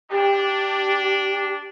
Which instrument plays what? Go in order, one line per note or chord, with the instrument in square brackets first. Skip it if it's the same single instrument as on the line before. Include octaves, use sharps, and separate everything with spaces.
[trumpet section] D4 [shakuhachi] G4